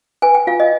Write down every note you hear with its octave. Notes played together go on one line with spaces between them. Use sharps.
B4 G#5
G5
F4 F5
D#5